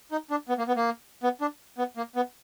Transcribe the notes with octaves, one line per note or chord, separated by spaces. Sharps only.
D#4
D4
B3
A#3
B3
A#3
B3
D4
B3
A#3
B3